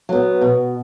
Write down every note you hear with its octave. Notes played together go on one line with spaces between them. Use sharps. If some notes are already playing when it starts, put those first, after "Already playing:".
F#3 B3
B2